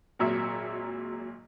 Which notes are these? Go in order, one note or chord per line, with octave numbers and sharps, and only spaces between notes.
G#1 A#2 F#3 E5